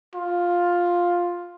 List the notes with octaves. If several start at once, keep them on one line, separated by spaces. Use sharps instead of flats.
F4